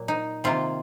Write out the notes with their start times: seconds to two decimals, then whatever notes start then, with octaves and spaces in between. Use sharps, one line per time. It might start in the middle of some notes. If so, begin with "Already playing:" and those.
Already playing: A#2 F#3 A#3
0.08 D#4
0.44 C3 D#3 A#3 F4